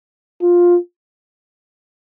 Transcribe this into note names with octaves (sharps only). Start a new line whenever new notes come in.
F4